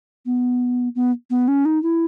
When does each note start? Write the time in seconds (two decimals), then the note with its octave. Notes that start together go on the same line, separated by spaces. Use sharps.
0.26 B3
0.95 B3
1.30 B3
1.48 C#4
1.65 D#4
1.83 E4